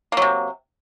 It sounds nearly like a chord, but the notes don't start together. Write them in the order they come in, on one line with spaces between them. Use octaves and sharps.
A#3 F#3 C3